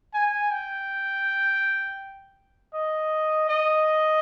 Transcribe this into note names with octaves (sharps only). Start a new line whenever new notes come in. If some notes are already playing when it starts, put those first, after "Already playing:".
G#5
G5
D#5
D#5